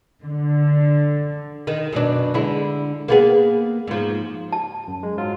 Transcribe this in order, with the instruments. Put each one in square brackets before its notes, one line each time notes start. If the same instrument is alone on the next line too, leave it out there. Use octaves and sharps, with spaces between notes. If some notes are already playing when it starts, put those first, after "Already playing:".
[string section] D3
[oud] D#3
F#2 B2 D4
D3 G#3 E4
A#3 B3 G#4
G#2 F3
[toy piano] A5
[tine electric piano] F#2
G#3
G#2 F#3 F4